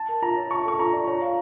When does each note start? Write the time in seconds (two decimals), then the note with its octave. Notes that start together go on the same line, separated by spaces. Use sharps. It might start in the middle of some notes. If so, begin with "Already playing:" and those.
Already playing: A5
0.09 A#4
0.22 F4 A#5
0.36 C#5
0.51 A5 C#6
0.65 A4 C#6
0.79 F4 A#5
0.93 D5
1.07 C#5 A#5
1.22 F5